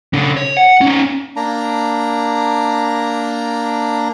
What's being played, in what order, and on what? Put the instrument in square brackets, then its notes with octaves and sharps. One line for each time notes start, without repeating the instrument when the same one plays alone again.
[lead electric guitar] C#3 D4
C#5
F#5
C#4 D#4
[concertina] A#3 D4 A#5